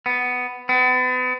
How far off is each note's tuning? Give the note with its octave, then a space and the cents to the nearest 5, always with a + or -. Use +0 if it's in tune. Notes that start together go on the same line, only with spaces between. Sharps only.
B3 +10
B3 +40